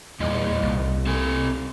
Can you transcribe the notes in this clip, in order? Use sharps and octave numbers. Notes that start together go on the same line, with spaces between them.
E2 A#2 G3 D#5
C2
C4 A4 G#5